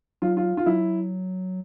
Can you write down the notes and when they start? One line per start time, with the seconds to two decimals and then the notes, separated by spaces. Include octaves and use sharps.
0.22 F#3 F4
0.37 F4
0.57 F4
0.66 F#3 E4